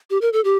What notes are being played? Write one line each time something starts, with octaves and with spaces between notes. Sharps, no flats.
G4
A#4
A4
G4